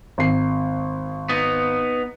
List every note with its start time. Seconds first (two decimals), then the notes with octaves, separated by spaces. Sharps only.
0.18 G#1 C7
1.29 B3 D#4